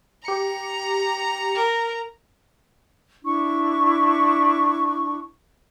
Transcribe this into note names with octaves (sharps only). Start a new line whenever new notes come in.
G4 A#5 C#7
A#4
D4 E4 C#6